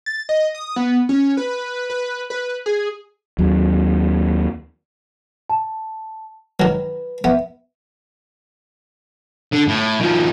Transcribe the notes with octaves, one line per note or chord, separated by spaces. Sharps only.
A6
D#5
D#6
B3
C#4
B4
B4
B4
G#4
D#2 F#3
A5
D#3 F#3 B4
B3 E5
D3
A2
D#3 F3